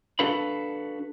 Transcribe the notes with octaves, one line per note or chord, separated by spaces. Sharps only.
D4 F#4 A4 B4 F5 B5